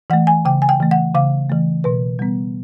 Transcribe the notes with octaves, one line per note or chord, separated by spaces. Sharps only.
E3 A3 F#5
G#5
C#3 G5
G#5
G5
E3 A3
F#5
C#3 F5
E3 A3
B2 B4
G3 B3